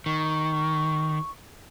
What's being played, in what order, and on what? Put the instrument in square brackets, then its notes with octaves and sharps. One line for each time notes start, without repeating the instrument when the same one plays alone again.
[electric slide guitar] D#3 [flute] C#6